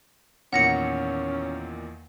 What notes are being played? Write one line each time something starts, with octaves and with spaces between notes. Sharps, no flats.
E2 A#2 D#3 C#4 F#5 A#6 C#7